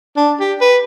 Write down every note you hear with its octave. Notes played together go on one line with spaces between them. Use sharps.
D4
G4
B4